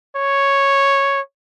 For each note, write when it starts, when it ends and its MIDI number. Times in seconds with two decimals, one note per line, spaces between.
0.16 1.20 73